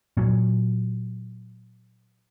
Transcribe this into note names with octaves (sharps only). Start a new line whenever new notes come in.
A#2 F#3